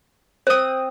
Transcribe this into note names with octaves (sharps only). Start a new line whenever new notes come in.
C4 C5 D#6